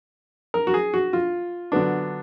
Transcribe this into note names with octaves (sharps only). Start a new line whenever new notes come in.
A#4
F#4
G#4
F#4
F4
D3 F#3 B3 D4